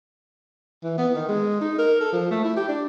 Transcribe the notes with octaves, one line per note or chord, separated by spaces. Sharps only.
E3
B3
D#3
G#3
D#4
A#4
A4
F3
A3
E4
G4
D4